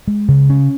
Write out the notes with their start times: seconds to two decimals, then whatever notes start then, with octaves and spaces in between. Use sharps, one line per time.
0.08 G#3
0.28 C#3
0.50 C#4